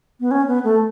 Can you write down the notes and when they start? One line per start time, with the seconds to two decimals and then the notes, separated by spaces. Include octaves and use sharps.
0.20 B3
0.31 C#4
0.48 B3
0.64 A3